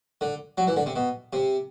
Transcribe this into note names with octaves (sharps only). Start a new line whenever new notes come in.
D3
F#3
E3
D3
C3
B2
C3